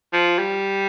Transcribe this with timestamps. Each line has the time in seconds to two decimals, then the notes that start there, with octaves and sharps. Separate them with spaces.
0.13 F3
0.39 G3